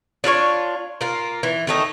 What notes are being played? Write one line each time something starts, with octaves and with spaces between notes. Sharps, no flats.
D4 F4 A4 C#5
A#3 F4
E3
D#3 A3 D#4